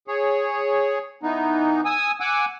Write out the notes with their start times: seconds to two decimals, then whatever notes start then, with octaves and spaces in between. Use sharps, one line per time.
0.07 G#4 C#5
1.23 E3 B3 D#4
1.85 G#5 D#6 E6
2.20 F#5 G#5 D6 E6